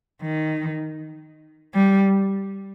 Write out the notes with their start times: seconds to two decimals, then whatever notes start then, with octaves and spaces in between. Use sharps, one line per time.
0.22 D#3
1.74 G3